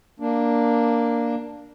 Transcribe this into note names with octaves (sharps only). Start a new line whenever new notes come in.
A#3 D4